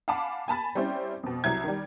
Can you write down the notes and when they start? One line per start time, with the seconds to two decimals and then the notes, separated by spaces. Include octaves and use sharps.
0.08 F5 F#5 G#5 A5 B5 D6
0.48 G#5 A5 B5 A6
0.75 G3 C4 C#4 E4 C5
1.23 F2 B2
1.44 C2 F#3 E4 G#6
1.64 D#3 G3